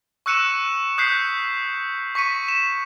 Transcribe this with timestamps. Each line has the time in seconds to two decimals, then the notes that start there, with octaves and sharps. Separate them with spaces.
0.26 C#6 E6 F#6 C#7 D#7 E7
0.98 D#6 F#6 G6 B6 C7
2.15 C#6 B6 C#7 D#7
2.48 E7